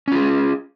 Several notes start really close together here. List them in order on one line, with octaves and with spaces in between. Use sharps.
C#4 F4 G#4